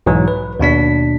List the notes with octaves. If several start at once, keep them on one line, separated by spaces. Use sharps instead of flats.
B1 G#2 E3 F#3
B4
D#2 B2 D4 B6